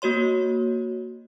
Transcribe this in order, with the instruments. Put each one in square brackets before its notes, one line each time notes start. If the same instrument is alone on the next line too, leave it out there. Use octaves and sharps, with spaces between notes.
[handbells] A#3 F#4 C#5 C6